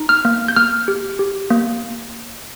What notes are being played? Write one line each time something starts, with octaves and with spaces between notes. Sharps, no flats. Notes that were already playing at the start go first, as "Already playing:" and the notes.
Already playing: D#4
F6
A#3
G6
A#3 F6
G4
G4
A#3